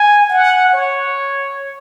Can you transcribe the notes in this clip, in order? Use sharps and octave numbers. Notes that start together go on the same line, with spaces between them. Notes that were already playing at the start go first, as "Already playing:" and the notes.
Already playing: G#5
F#5
C#5